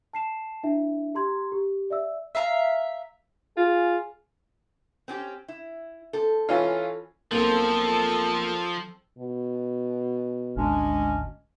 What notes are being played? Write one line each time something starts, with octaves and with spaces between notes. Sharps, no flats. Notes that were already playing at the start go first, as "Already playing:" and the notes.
A5 C7 E7
D4 E4 E5
G4 A#5 C6 G#6
G4
D5 E5 E6
E5 F5 A5 A#5
F4 G#4
C4 C#4 G4
E4
C4 A4
E3 C#4 F4
B1 F3 A#3 C4 A4
B2
G#1 D2 G#3 C#4 D4